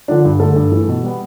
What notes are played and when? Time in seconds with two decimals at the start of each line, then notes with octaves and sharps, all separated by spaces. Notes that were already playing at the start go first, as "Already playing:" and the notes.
0.08 D3 F3 D4
0.25 G2
0.40 D3 A3 A4
0.56 G2
0.72 E3 A3
0.88 B2
1.03 G3 B3